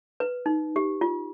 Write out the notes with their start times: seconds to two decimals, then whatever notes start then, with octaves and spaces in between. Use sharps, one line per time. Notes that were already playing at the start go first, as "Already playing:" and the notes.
0.20 B4
0.46 D#4
0.76 G4
1.01 F4